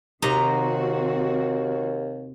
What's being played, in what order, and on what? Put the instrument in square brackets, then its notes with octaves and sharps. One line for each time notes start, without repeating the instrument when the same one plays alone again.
[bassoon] D#2 [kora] C3 D#4 [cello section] D#3 C4 F#4 [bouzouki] A#5